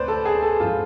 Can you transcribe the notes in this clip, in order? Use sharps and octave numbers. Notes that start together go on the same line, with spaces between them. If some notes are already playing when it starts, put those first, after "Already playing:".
Already playing: D2 C3 B4 C5 D5
A4
G#4
A4
G#2 F3 F4